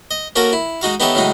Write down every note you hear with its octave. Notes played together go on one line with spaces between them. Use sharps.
D#5
A#3 C#4 F#4 A4 A#4
E4
G#3 D#4 F#4 F5
B3 D#4 G4 A4 C#5 E5
A2 C#3 F#3 G#3 D#4